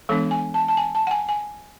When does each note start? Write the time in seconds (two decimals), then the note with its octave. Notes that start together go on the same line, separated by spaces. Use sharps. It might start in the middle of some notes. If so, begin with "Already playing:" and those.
0.09 E3 G#3 B3 D4 A4
0.31 G#5
0.54 A5
0.68 A5
0.77 G#5
0.95 A5
1.07 F#5
1.11 G#5
1.29 G#5